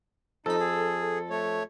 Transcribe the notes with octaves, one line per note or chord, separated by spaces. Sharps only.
F2 D#4 A4 B5
G#4
A3 C#5